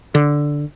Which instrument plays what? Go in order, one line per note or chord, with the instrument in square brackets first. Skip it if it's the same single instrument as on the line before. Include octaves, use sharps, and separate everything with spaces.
[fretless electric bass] D3